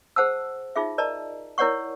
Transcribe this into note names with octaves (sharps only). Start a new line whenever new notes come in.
G#4 C5 F#5 A5 E6
D#4 F4 G#4 E5
A#4 D5 D#5 A5 A#5
E4 A#4 C#5 D5 F#5 C#6